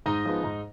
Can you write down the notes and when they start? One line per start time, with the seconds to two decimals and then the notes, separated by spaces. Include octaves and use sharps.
0.06 G#2 D#4 D#5
0.25 F3 G#3 B3
0.43 G#2